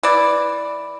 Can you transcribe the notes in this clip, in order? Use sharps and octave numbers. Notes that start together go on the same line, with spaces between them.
E3 D5